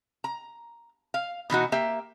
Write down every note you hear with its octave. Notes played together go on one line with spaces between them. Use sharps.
A#5
F5
B2 E3 D#4 F#4
A#3 G4 E5